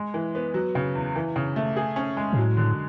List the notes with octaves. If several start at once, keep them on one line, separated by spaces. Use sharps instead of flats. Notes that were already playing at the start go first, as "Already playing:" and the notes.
Already playing: G#3
E3
B3
F#3
C#3
E2
E3
C#3
A3
G#4
C#4
G#3
B2
A2 F#3
D3